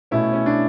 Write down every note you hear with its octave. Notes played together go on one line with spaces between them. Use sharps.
B2 A3 C#4 E4
C#4
D4